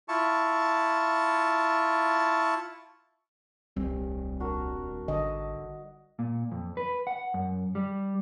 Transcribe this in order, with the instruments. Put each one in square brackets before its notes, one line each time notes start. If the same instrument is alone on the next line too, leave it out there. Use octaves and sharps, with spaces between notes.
[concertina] E4 F4 A5 C#6
[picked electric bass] D#1 C4 [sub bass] C2 [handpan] G3
[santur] D4 F#4 A#4
[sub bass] G#1 [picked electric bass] D3 [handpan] D#5 [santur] A5 D6
[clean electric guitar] A#2
F2
B4
F#5
F#2
G3